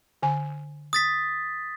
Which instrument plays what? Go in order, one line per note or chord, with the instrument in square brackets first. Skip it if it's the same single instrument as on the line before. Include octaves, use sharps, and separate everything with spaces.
[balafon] D3 G#5
[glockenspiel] D#6 A6 B6